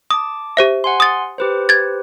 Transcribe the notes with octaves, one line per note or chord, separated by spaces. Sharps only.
A5 D6 D#6
G4 C5 E5
F#5 G#5 C6
D#6 A6
G4 B4 C5
G#6 A6